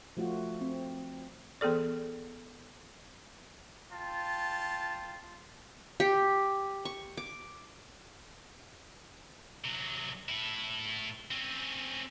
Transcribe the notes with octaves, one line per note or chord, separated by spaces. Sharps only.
F3 A3 F4 F#4
C4
E3 B3 G#4 A4 D5
F4 G5 A5
G4
C#6
D6
C3 F#3
A2 E4
C4 C#4